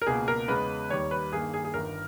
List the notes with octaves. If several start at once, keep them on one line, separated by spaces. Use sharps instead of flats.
A#4
C#2 B2 A#3 G#4
A#4
E2 C#3 G#3 B3 B4
D#2 D#3 G3 C#5
B4
G2 D#3 A#3 G#4
G#4
G#4
G1 G2 D#3 A#4